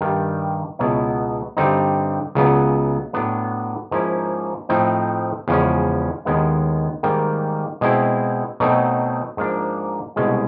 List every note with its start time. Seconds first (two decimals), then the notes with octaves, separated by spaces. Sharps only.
0.01 G2 D#3 G3
0.79 C#2 B2 F#3 B3 E4
1.57 G2 D3 G3 C4 D#4
2.35 C#2 C#3 F#3 B3
3.13 A2 F#3 B3 D4
3.91 G#2 F3 A#3 C#4 E4
4.69 A2 F3 A3 C4 D#4
5.48 E2 C#3 F3 G#3 C#4
6.25 D#2 D#3 G#3 B3 E4
7.03 G#2 D#3 G3 A#3
7.81 B2 G#3 C4 E4
8.60 B2 F#3 A3 C4 D#4
9.37 G#2 F3 A#3 D4
10.16 C2 B2 G#3 C#4